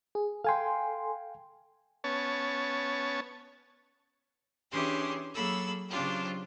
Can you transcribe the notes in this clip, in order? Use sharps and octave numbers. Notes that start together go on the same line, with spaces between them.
G#4
A4 F5 G5 G#5 C6
B3 C#4 C#5 A5
E3 C#4 D4 G4 G#4 C6
F#3 A#3 G#4 A4 B5 E6
C#3 F#3 C4 D4 F4 G4